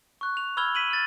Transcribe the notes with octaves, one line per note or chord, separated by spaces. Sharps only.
C#6 F#6
F7
B5 E6 F6 G#6 F7 G7
B6 D#7 F#7
F6 A6